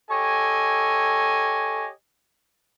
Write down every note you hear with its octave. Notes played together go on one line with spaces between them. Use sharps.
G4 A4 C#5 D#5 G#5